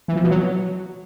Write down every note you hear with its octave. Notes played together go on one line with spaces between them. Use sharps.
E3
F3
B2
F#3